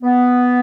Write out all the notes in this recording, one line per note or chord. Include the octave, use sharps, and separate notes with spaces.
B3